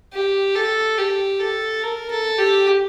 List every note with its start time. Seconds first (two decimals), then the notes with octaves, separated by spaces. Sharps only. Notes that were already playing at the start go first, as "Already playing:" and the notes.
0.13 G4
0.55 A4
0.98 G4
1.40 A4
1.83 A#4
2.11 A4
2.38 G4